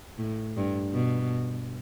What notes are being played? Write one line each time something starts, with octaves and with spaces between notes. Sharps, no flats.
A2
G2
B2